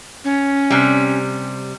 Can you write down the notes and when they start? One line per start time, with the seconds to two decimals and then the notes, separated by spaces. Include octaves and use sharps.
0.25 C#4
0.70 C3 G3